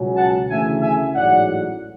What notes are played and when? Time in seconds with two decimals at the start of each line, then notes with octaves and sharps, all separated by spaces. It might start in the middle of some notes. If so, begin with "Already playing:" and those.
Already playing: C#2 B2 F#3 C#4
0.16 F#5 A5
0.50 D2 C#3 E3 A3 E5 G#5
0.81 E5 G#5
1.14 A1 G#2 F#3 D5 F#5